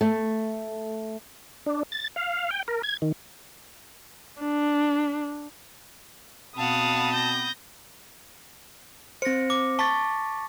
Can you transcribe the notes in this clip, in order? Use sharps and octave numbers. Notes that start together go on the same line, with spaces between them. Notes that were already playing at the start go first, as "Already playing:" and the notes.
A3
D4
A6
F5
G5
A#4
G#6
D#3
D4
B2 B3 C4 F5 F#5 A5 B5 D#6
G6 A#6
C4 C5 A#6 C#7
D6
A5 C#6 A6 B6